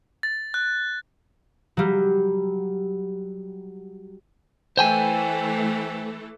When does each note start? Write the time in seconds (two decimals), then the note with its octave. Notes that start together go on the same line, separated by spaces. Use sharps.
0.23 A6
0.54 F#6
1.77 F#3 G3
4.77 E3 A3 A4 C5 G5 G#5